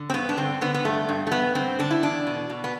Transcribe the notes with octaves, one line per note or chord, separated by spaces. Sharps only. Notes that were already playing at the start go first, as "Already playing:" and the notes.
Already playing: D3
C4
G2 B3
D4
D3 C4
D3 B3
B3
G2 A3
G2
A3
G2 B3
D3 C4
D3 D4
E4
E2 D4
B2
B2
B3